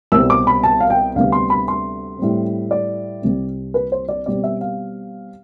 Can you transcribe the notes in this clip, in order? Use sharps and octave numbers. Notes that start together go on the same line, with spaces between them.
C2 B2 G3 C4 E6
D6
B5
A5
F5
G5
D2 C3 G3 B3 F5
C6
B5
C6
A2 G3 C4
D5
C2 C3 G3 C4
B4
C5
D5
B2 G3 C4 D5
E5
F5